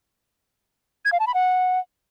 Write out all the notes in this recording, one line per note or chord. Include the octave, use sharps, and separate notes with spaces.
G#6
F5
A5
B5
F#5